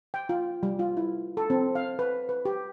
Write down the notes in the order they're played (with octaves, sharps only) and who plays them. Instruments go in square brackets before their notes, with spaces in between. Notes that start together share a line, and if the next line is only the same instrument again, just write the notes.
[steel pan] G5
F4
G3
F4
E4
A4
C4
F5
B4
B4
G4